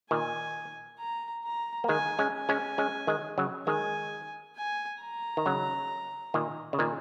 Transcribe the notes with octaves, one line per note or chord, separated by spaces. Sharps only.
A#2 D#3 G#5
A#5
A#5
A#3
D#3 G#3 G#5
G#3 C#4
G#5
G#3 C#4
G#3 C#4
D#3 G#3
C#3 F#3
D#3 G#3 G#5
G#5
A#5
D#3
C#3 F#3
A#2 D#3
C#3
A#2 D#3